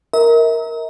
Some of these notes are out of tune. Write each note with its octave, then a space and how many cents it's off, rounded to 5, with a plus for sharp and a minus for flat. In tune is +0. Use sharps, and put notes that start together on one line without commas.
A#4 +0 E5 -45